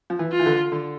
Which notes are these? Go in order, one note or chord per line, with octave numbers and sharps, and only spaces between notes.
F3
E3
F4
E3
D3
D3